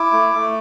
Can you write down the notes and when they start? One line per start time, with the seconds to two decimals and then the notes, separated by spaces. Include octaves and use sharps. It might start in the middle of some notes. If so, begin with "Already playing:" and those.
Already playing: E4 D6
0.12 A3
0.34 A3